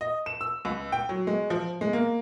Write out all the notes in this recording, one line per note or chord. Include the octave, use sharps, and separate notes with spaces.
D#5
E7
E6
C#2
G5
F#3
G#3
F3
G#3
A#3